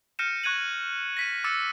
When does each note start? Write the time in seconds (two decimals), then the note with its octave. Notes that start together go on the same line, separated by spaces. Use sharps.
0.19 F6 G6 A#6 C#7 D#7 E7
0.44 C#6 F#6 G#6 D#7 F#7
1.17 A#6 B6 D#7
1.44 D6 E6 A6 C#7